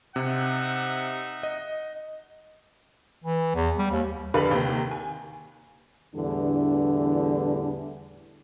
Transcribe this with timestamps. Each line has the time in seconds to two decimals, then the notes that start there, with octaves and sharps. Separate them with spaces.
0.16 C3 D#4 E5 F#5
1.43 D#5
3.24 E3
3.55 E2
3.78 G3
3.91 D#2
4.34 F1 D3 G4 B4 F5 B5
4.51 D#2 C3
4.91 G#5
6.14 E2 A2 D3 E3 G3 D4